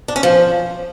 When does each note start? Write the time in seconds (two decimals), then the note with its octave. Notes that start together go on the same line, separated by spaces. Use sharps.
0.08 D4
0.16 C#4
0.23 F3